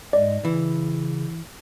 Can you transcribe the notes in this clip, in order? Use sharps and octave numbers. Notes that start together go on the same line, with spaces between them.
G#2 G#3 D5 D#5
C#3 E3